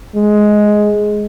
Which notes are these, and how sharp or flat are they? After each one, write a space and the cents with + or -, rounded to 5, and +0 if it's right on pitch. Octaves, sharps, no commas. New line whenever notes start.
G#3 +10